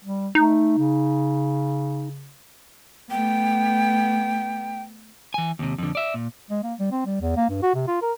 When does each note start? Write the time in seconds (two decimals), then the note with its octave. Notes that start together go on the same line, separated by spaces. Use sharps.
0.04 G3
0.35 A3 D#4
0.78 C#3
3.11 A3 B3 G5
5.34 E3 G#5
5.59 D#2 C3
5.78 F2 D3
5.95 D5 E5
6.14 A#2
6.50 G#3
6.63 A#3
6.79 G3
6.91 C4
7.06 G3
7.21 E2
7.37 A#3
7.50 G2
7.62 F#4
7.75 C3
7.87 F4
8.02 A#4